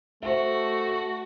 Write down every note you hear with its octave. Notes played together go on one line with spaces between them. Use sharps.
A3 F#4 C5 E5